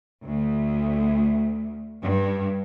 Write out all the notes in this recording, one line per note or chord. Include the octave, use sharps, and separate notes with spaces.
D2
G2